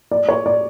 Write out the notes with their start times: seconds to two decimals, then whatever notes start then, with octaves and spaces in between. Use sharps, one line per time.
0.11 D5
0.29 C#5
0.46 D5